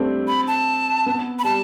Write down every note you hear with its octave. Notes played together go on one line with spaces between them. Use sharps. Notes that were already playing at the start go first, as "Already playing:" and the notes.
Already playing: G3 A3 C4 D4
B5
A5
B3
B5
G3 A5